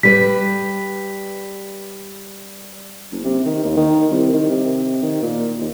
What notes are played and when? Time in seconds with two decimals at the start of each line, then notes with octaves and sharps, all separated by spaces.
0.03 G3 B4 B6
3.11 F#1
3.24 C3
3.46 D#3
3.64 D#2
3.77 D#3
4.11 C2
4.33 D#3
4.50 C3
5.02 D#3
5.23 A#2
5.60 D#2